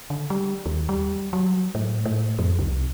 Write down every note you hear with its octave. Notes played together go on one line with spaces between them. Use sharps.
D3
G3
D#2
G3
F#3
A2
A2
F2
C2